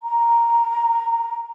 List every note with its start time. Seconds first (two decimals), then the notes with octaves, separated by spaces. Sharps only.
0.03 A#5